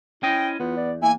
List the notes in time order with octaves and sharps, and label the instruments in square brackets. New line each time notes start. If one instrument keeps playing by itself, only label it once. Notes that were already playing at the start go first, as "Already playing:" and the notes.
[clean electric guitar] C#4 C5 D#5 [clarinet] E4 [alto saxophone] G5
[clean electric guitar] E2 [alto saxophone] B3 [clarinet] F4
[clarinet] D5
[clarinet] A#3 [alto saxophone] E4 [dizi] G#5